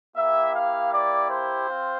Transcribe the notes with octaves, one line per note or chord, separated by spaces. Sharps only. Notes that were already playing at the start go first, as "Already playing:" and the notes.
A#3 E4 G4 E5
F5
D5
C5
C4 F4